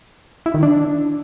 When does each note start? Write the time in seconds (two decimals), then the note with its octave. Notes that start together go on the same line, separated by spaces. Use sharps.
0.46 E4
0.54 D#3
0.63 D4